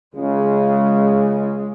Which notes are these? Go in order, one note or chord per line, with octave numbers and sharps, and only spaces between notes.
C#2 C#3 G#3